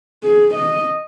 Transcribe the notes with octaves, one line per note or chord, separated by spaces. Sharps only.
G#4
D#5